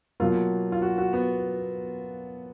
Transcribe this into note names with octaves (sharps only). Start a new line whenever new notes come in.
B2 F#3 A#3 F4
F4
F#4
F#4
B3